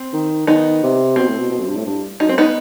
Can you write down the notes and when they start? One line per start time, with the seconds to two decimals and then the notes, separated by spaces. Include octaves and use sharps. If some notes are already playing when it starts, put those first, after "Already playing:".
Already playing: C4
0.13 D#3
0.47 D#3 B3 D#4
0.83 C3
1.16 B2 C4
1.28 A2
1.38 B2
1.51 B2
1.60 F#2
1.68 G2
1.76 A2
1.85 G2
2.20 F#2 D#4
2.29 C4
2.38 B3 D#4